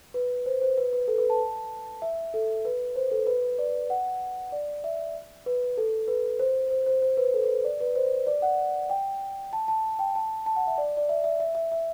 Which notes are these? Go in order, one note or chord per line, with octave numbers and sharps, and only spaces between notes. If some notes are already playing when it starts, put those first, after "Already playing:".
B4
C5
C5
B4
B4
A4
B4
A5
E5
A4
B4
C5
A4
B4
D5
F#5
D5
E5
B4
A4
B4
C5
C5
C5
C5
B4
A4
B4
D5
B4
C5
D5
F#5
G5
A5
A5
G5
A5
A5
F#5
E5
D5
D5
E5
E5
E5
E5
E5